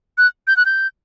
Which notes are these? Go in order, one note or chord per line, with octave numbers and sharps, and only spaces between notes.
F#6
G6
F#6
G6